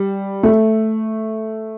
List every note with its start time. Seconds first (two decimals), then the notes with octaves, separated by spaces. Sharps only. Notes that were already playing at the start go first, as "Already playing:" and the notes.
Already playing: G3
0.43 A3